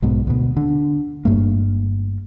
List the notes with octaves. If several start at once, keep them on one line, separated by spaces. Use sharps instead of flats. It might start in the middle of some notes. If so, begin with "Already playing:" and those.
B1 G#2 B2
D2 B2
D3
G1 G2 A3 A#3